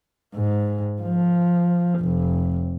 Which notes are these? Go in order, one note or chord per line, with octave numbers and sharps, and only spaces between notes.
G#2
F3
F1